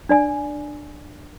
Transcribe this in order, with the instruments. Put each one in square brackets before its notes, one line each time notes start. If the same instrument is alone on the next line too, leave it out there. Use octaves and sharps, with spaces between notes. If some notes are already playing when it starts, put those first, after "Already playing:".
[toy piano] D4 D5 G#5